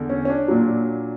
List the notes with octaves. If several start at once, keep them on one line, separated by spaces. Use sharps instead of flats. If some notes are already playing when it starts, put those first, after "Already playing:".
Already playing: E2 D3
C#4
C#4
D4
A#2 F#3